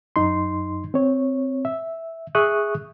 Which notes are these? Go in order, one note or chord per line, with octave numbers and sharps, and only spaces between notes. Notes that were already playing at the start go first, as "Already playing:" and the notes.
F#2 D#4 C6
C4 C#5
E5
G#4 E5 C#6 D#6 F#6